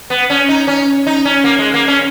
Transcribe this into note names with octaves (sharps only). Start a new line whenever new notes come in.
B3
C#4
D#4
C#4
D#4
C#4
A#3
G#3
A#3
C#4